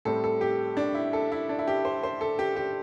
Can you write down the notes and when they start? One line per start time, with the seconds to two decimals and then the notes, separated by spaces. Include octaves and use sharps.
0.05 A2 G3 C4 A4
0.24 A4
0.41 G4
0.77 D4
0.94 E4
1.13 A4
1.32 E4
1.49 D4
1.59 E4
1.67 G4
1.85 C5
2.03 C5
2.21 A4
2.39 G4
2.56 G4